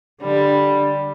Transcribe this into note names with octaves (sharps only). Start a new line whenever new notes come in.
D3 G3